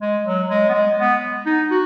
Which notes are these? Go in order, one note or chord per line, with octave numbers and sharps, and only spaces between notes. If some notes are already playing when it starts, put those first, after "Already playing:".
G#3
F#3
G#3
B3
G#3
B3
D#4
F#4